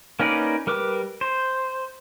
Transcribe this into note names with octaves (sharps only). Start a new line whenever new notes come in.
A#3 C#4 D#4 B4 D5
G3 A#4 B4 D6
C5